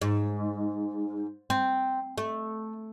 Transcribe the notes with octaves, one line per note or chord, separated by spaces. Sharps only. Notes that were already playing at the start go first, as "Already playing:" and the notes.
G#2
C4
A3